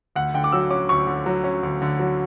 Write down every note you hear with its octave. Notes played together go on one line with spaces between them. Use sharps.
D2 F#5
D3 G5
D6
F#3 E6
C#4 D6
D2 C#6
D3
F#3
C#4
D2
D3
F#3